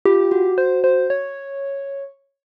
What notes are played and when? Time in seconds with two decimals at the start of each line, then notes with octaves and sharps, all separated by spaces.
0.05 F4 G4
0.31 F#4
0.58 C5
0.84 C5
1.10 C#5